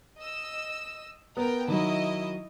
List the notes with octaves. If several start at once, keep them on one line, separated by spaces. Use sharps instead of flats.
D#5 E6
B3 A#4 G5
D#3 F#3 E4 D#5